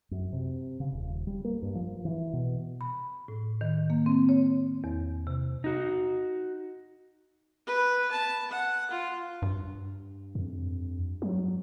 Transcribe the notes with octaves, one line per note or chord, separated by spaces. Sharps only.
F#2
C3
C#3
D#1
G3
A#3
G2
F3
E3
B2
B5
A2
D#3
A#3
C4
C#5
E2
C3
D#4 F#4
B4
A5
F#5
F4
G2
F2
F#3